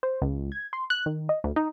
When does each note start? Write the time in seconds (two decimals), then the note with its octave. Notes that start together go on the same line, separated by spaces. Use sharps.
0.03 C5
0.22 C#2
0.52 G#6
0.73 C6
0.90 F#6
1.06 D#3
1.29 D#5
1.44 D2
1.56 D#4